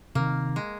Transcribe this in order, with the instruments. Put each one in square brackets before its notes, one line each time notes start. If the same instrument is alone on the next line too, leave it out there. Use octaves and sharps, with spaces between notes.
[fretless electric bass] C3 D#3 [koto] A#3
[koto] G#3